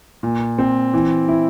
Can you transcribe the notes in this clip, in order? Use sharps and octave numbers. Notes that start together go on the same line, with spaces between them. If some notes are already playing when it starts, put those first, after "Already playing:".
A#2
C4
E3
E4